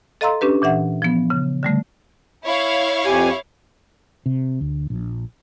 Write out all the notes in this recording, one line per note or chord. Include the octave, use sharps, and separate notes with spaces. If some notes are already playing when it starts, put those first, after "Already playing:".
A4 D#5 F5 A#5 C6 E6
C#4 D4 G4 B4
A#2 E3 E5 F#5
F3 B3
C#3
D3 G3 A3
E4 C#5 F5
F2 G4 G#5
C3
D2
A#1